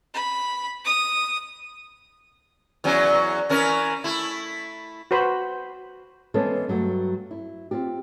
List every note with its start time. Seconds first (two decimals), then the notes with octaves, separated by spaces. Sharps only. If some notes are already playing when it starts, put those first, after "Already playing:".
0.14 B5
0.85 D#6
2.84 E2 F#3 C#4
3.49 E3 C#4 A#4
4.04 A3 E4
5.11 F#4 B4 C5 B5
6.34 E3 G#3 B3 C#4 A4 C5
6.68 G2 F#3 G#3 A3
7.31 E4
7.71 C4 F4 G4